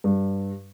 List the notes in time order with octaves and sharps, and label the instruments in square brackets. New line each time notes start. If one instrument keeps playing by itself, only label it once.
[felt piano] G2